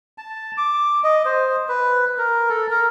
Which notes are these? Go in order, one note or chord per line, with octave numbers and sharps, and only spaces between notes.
A5
D6
D#5
C5
B4
A#4
A4
A#4